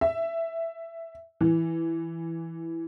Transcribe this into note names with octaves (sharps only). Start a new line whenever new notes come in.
E5
E3